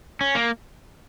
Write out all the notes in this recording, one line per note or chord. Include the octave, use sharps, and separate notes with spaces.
C#4
A#3